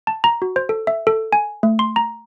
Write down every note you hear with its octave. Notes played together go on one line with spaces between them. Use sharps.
A5
A#5
F#4
C5
A4
E5
A4
G#5
A3
C6
A#5